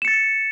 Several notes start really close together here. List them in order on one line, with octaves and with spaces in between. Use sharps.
E7 C#7 A6